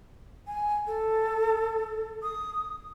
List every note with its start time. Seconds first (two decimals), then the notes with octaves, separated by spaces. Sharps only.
0.47 G#5
0.87 A4
2.23 D#6